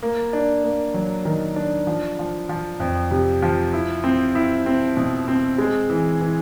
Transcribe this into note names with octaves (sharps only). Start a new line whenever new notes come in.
A#3
D4
A#3
F#3
D#3
D4
F3
F3
F3
F2
C3
F3
E4
C4
E4
C4
B2
C4
G#3
E3
E3